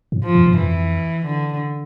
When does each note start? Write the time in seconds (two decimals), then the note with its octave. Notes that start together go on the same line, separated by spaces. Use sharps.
0.12 G2
0.24 F3
0.35 F2
0.46 G2
0.58 F2 E3
1.26 D3